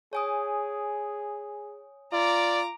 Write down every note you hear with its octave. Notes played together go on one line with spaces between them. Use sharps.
G#4 C#5 G#5 D#6
F4 D5 A#5 D6